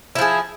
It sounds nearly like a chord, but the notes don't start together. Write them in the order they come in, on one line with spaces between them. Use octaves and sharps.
E4 F3 G#4